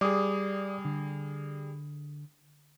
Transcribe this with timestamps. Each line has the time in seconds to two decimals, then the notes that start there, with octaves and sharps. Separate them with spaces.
0.01 G3 G#4 D5 D6 D#6
0.85 D3